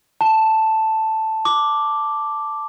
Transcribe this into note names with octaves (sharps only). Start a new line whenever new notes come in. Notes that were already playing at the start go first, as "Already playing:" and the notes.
A5
D6